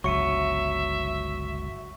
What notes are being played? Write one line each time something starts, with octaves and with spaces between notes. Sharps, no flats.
G1 C#2 F#3 E5 C#6 C#7 D#7